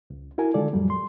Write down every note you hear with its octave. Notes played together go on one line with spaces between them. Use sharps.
C#2
E4 F#4 A#4 G#5
D3 D#3 G#3 F4 A4 D5
F2 A2 F#3 G3
C6